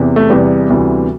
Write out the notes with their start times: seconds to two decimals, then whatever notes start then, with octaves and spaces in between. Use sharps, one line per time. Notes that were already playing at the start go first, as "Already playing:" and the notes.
Already playing: E2 C3 E3
0.16 A3
0.30 E2 C3 E3 G3 B3
0.70 D2 C3 E3